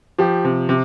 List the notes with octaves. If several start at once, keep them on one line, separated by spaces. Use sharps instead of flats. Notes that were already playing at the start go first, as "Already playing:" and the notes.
F3 G4
C3
C3